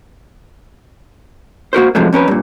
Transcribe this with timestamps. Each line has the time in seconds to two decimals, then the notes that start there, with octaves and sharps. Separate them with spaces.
1.73 A#3 F#4 A#4 C5
1.95 A2 C3 F3 F#3 G#3 A3
2.13 F2 C#4 A#4 B4
2.28 G2 A#2